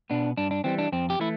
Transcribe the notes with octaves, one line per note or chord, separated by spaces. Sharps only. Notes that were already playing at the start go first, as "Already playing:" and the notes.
B2 B3 D4
G2 D4
D4
E3 G3 C4
D4
F2 C4
G4
E3 A3 E4